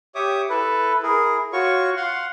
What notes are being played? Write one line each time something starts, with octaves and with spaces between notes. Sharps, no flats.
G4 C#5 E5 D6 D#6
E4 A4 B4
E4 G#4 A#4
F4 F#4 C#5 C#6
F5 F#5 C6